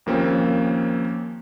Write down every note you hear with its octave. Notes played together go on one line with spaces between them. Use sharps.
D#2 F3 A#3 C4 C#4